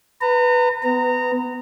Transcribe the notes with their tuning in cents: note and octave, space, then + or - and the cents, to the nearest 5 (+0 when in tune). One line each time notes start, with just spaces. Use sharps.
B4 +0 A#5 -35
B3 +20 A#5 -20